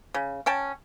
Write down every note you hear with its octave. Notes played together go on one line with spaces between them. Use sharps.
C#3
C#4 G5 A5